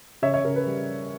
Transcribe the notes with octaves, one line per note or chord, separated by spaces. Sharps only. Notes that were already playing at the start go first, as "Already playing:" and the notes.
C#3 C#5 E5
C#5 E5
C#3 A#4
B4
G3